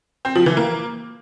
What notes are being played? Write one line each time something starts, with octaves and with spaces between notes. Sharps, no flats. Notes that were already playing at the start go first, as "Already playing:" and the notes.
C4
F3
E3
A#3